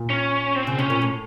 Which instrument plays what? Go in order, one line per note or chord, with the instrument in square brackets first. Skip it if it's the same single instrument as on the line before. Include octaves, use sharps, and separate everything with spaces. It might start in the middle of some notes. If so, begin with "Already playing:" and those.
Already playing: [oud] A#2
[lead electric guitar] C#4
C4
[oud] C#3
[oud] C3 [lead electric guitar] C#4
[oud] A#2
A2